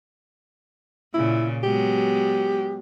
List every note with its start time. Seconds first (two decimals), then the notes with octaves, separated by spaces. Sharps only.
1.14 A#2 C#3 E4
1.64 F#3 G#3 B3 G4